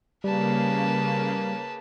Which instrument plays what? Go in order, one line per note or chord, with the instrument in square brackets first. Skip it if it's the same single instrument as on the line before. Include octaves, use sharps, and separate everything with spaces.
[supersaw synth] C#3 A#3 [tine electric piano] G3 [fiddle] B4 A5